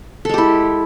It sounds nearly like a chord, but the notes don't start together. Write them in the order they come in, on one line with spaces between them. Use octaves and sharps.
A4 G#3 G4 E4